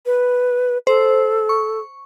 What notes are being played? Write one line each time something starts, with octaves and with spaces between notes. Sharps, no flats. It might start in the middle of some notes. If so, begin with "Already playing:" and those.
B4
A4 C5
C#6